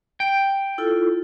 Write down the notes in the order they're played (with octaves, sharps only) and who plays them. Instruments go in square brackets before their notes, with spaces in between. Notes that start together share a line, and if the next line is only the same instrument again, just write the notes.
[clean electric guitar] G5
[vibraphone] E4 F4 A4